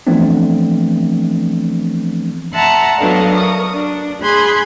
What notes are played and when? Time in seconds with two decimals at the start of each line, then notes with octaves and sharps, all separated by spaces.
0.07 E3 F3 A3 B3 C4 D4
2.54 E5 F#5 A5 A#5 C6
2.97 F#3 B3 D4 A4 D#5 F5
3.33 A#4 C#6 D#6
3.72 D4
4.21 G#4 B5 C6 F#6 G#6